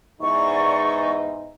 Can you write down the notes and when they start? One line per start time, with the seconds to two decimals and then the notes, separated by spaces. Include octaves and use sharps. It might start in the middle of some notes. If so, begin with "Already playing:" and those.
0.21 E2 G#2 D#4 D5 C#6